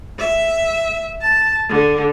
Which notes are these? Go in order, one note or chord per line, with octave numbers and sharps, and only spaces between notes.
E5
A5
D3